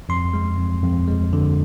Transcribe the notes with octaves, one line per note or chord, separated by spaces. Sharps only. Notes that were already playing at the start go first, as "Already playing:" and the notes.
F2 C6
G#3
F2
F2
G#3
D3